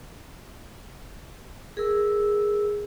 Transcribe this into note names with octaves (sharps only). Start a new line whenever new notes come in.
G#4 A#4 E6